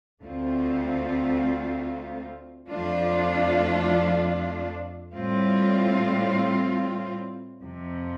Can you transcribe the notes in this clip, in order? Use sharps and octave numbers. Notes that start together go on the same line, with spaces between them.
D2 D3 A3 C4 F4
F2 F3 A3 D4 F4
A2 G3 C4 F4
F2 C3 F3